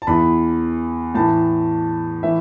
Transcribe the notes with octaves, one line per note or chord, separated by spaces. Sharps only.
A5
E2 E3 B5
A2 E3 A5
A2 E3 E5